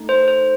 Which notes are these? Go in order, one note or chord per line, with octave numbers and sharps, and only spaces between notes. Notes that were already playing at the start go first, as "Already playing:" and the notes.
Already playing: A3 D#4 A4
C5
C5